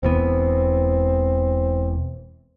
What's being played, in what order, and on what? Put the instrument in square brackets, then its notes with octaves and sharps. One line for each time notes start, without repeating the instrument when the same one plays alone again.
[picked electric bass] E1 E2 B3 [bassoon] C4